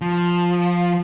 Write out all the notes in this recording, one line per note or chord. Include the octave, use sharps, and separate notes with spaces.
F3